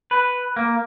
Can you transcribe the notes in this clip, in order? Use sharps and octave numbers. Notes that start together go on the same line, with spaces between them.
B4
A#3